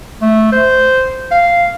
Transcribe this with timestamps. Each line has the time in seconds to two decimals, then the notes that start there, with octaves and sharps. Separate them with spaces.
0.22 A3
0.52 C5
1.31 F5